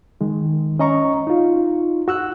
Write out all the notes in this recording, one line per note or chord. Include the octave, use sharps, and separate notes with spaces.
D#3 G#3
C#4 D#5 A#5 C#6
D#4 F4
F#4 E6 F#6